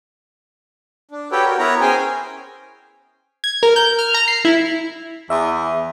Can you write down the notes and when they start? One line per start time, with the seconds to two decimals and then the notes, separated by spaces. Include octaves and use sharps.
1.11 D4
1.32 F#4 G4 A4 B4 C#5 G5
1.45 F#4 A#4
1.59 B3 E4 A#4 B4 C#5 A#5
1.81 C#4 G#4 C5 C#5 G5 G#5
3.44 G#6
3.63 A#4
3.76 G6
3.99 F6
4.14 A#5
4.28 C7
4.45 E4
5.30 E2 E5